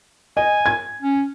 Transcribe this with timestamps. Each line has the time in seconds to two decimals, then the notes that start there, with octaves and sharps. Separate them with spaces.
0.37 D#5 G#5
0.66 G#6
1.02 C#4